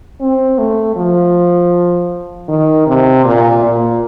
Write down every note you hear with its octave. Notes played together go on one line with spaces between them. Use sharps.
C4
A3
F3
D#3
C3
A#2
A#2